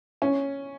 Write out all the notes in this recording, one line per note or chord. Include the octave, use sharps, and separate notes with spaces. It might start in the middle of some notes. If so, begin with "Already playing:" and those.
C#4